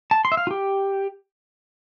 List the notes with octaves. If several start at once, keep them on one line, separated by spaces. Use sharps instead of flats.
A5
C6
E5
F5
F4
G4